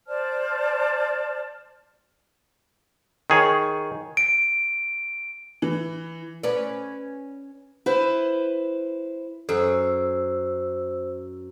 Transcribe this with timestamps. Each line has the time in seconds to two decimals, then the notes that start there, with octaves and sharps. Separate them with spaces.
0.08 C5 D5 A5 F6
3.30 D#3 G#4 C#5
4.17 D7
5.62 E3
6.43 C#4 B4 D5
7.86 E4 B4 C5
9.49 F#2 A4 C5 E6